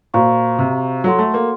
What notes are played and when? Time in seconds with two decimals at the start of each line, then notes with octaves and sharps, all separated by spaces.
0.14 A#2 F#4 C5 F5 A#5 C#6
0.59 C3
1.04 F#3 F#4 A4 C#5 F#5 C6
1.19 A3
1.34 A#3